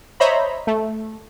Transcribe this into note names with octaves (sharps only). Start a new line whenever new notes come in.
C5 C#5 D#5 E5 A#5 B5
A3